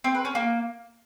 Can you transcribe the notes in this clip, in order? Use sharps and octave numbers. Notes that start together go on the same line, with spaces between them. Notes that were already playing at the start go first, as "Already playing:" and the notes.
C4
B4
C#4
A#3